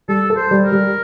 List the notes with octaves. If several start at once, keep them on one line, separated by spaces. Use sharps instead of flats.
G3 A4
A4
C5
G3
A#4
G3